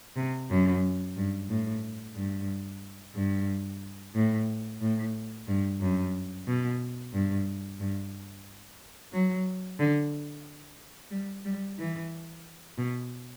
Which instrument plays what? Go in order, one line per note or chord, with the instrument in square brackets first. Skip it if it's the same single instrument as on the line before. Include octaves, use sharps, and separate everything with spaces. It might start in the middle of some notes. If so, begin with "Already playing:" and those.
[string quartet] C3
F#2
G2
A2
G2
G2
A2
A2
G2
F#2
B2
G2
G2
F#3
D3
G3
G3
E3
B2